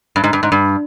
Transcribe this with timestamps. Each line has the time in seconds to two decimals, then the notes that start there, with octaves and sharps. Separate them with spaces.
0.16 G2
0.24 G#2
0.33 G2
0.43 G#2
0.52 G2